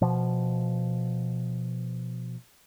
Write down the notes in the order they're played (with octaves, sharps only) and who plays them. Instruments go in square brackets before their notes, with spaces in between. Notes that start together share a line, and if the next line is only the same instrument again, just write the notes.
[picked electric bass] B2 F3